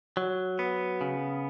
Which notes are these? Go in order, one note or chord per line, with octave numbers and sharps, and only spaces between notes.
F#3
B3
C#3